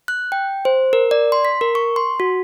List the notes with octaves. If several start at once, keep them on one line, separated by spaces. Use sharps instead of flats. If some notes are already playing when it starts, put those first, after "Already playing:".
F#6
G5
C5
A#4
D5
C6
B6
A#4
C#6
C6
F#4